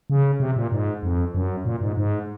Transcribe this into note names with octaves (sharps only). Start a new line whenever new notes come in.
C#3
C3
A#2
G#2
F2
F#2
A#2
G#2
G#2